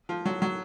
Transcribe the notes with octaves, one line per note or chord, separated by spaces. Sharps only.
F3
F#3
F#3